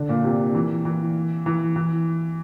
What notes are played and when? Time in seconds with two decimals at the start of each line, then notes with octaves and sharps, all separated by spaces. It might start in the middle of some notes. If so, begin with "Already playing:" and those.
Already playing: D3
0.09 A#2
0.24 C3
0.55 E3
0.85 E3
1.46 E3
1.76 E3